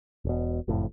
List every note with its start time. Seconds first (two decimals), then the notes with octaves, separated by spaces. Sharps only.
0.25 E1 B2
0.68 F#1 F2 A2